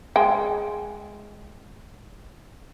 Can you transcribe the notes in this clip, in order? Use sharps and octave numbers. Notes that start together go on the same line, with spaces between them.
G#3 G5